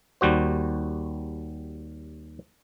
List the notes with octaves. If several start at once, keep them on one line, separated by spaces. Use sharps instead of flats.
D#2 G3 F#4 C5